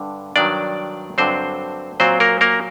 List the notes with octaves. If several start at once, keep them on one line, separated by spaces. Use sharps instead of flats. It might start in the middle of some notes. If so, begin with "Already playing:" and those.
Already playing: G2 D3
G2 D#3 F#3 D4 D5
G2 D3 F#3 C4 C5
A#2 F#3 C4 C5
A#3 A#4
A#3 A#4